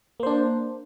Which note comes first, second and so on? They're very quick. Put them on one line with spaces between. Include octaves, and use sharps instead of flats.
A#3 C5 D4